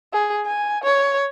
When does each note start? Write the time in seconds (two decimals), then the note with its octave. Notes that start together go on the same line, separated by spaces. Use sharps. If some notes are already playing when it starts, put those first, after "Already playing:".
0.13 G#4
0.46 G#5
0.84 C#5